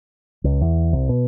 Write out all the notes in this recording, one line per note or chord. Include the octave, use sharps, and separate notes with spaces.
C#2
E2
C2
B2